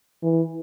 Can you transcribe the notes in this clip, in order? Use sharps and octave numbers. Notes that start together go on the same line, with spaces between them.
E3